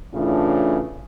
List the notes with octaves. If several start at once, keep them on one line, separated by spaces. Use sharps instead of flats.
A2 C#3 E3 D4 F4